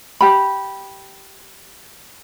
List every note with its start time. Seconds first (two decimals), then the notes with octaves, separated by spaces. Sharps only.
0.21 G4 B5